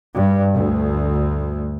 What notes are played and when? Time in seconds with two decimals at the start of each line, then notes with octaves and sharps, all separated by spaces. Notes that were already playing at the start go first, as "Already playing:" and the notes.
0.17 G2
0.54 D2